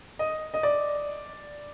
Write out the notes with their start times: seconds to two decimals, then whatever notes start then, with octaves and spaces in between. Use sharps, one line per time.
0.19 D#5
0.54 D#5
0.63 D5